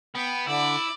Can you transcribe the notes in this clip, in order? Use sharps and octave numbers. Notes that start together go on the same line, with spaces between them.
B3 G5
D3 E4 D5